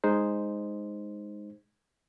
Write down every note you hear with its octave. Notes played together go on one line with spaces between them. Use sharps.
G#3 D#4 C5